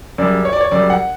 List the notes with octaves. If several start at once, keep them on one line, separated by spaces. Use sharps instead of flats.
F#2 C#3 G3 D5
C#5
D5
C#5
F#2 C#3 G3 D5
F#5